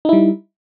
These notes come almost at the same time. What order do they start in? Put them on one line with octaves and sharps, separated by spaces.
D#4 E4 G3